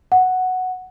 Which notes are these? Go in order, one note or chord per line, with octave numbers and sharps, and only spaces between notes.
F#5